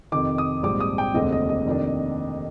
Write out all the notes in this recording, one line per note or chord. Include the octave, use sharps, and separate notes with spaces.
F2 C3 D#3 D6
D#6
A#1 G#2 G3 C4 D6
D#6
G5
F1 D#2 D3 G#3 C4 D#5
D#5
D#5
F2 C3 D#3 A#3 D4